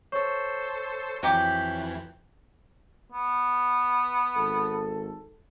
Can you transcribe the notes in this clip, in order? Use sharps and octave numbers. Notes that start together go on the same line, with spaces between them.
A4 C5 C#5 C#6
F2 E3 F#3 G4
B3
G#1 A4